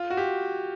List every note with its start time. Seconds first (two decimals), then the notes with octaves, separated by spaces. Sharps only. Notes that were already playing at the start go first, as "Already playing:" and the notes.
Already playing: F4
0.10 F#4
0.17 G4